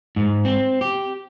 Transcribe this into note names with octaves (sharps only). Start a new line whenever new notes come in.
G#2
C4
G4